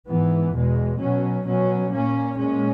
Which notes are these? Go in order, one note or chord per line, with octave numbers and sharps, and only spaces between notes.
G#2 E3 B3
E2 B2 G#3
B2 F#3 C#4
B2 F#3 C#4
A#2 A#3 C#4
A#2 G#3 C#4